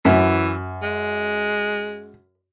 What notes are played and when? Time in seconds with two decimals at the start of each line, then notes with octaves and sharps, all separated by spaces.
0.05 F#2 E3
0.83 G#3